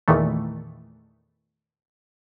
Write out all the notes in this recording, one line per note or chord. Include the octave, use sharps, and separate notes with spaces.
E2 A#2 D#3 E3 A3